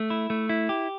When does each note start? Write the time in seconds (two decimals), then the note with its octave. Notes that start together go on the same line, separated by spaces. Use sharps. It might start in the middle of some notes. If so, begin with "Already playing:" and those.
Already playing: A3
0.10 E4
0.30 A3
0.49 E4
0.69 G4